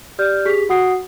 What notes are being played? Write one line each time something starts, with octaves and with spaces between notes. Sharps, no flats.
G4 D5 F6 G6
G4 G#4 B6
F#4 F#5 D#6 C7